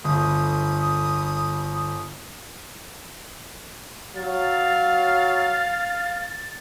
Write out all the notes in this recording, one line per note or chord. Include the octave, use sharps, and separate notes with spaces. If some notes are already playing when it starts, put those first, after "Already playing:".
G1 D2 D#6
F#3 F5 A6